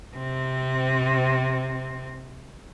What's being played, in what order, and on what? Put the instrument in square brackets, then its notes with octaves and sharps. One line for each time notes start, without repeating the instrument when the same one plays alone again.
[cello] C3 C4